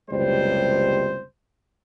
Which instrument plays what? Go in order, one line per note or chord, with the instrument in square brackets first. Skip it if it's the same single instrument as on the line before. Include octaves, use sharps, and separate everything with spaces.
[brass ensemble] F#1 C#2 C3 G3 C5